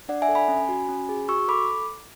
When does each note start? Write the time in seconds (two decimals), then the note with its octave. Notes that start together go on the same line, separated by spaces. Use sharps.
0.09 D4 D5 F#5
0.22 E5 G#5
0.29 A4
0.35 G#5 B5
0.48 C#4
0.69 F#4
0.89 C#4
1.09 G#4
1.28 F#4 C#6 E6
1.48 A4 B5 D6